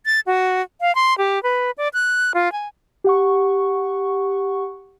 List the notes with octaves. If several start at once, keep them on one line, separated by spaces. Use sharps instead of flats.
A6
F#4
F5
C6
G4
B4
D5
F#6
F4
G#5
G4 F#5 C#6